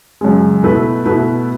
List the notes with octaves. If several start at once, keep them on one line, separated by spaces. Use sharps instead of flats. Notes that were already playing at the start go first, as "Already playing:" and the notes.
F#2 C#3 G#3
B2 A3 E4 B4
B2 A3 E4 B4